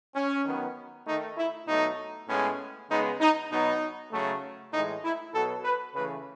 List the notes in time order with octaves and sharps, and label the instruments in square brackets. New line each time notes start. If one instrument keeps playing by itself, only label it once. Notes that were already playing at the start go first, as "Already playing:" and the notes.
[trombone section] C#4
D#3 F#3 B3
D#3 A3 D#4
E4
B2 F#3 A3 D#4
A2 G#3 B3 C#4
C#3 G#3 B3 D#4
D#4
B2 F#3 B3 D#4
C#3 F#3 A3
A2 E3 G#3 D#4
E4
B2 F#3 B3 A4
B4
C#3 E3 A3 B4